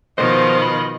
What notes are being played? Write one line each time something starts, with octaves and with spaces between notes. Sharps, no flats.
B2 D#3 F3 C5 D#5
B5